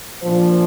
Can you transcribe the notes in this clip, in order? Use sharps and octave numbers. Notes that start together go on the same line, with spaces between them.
A#2 F3 D4 C5